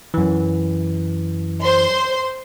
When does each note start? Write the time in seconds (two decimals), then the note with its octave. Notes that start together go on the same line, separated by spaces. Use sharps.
0.14 F#2 E3
1.63 C5 C6